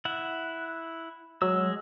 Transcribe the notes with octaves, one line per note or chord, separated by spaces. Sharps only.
E4 F#5
F#3 G#3 E6